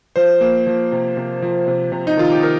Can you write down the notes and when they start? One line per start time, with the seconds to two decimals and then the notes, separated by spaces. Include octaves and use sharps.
0.16 F3 C5
0.41 A#3
0.67 F3
0.92 C3
1.17 C3
1.42 F3
1.68 C3
1.92 C3
2.07 D#4
2.17 D#3 F4
2.32 G4
2.43 D#3 A#4